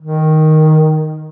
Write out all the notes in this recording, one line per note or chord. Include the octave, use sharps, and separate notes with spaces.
D#3